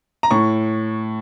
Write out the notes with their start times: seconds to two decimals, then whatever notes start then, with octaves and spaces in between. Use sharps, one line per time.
0.23 A#5
0.31 A2 C#6